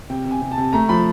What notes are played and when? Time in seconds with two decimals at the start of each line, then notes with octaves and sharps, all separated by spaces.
0.10 C3 G5
0.25 C3
0.31 G#5
0.41 C3
0.52 A5
0.58 C3
0.73 A3 A#5
0.89 F3 B5